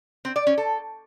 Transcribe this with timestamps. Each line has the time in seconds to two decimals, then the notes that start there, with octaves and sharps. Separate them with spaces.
0.25 C4
0.36 D5
0.47 C#4
0.58 A4